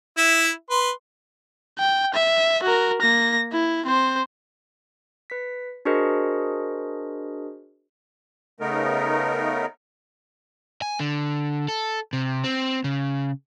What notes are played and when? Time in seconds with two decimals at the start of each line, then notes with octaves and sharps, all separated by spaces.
0.17 E4 E5
0.70 B4 C6
1.79 G5
2.14 E5
2.63 F#4 A#4
3.02 A#3 A#6
3.52 E4
3.86 C4 C5
5.30 B4 B6
5.85 D4 F#4 G#4 A#4 C5 D#5
8.60 C#3 A3 B3 D#4 A#4
10.82 G#5
11.00 D3
11.68 A4
12.13 C3
12.44 C4
12.84 C#3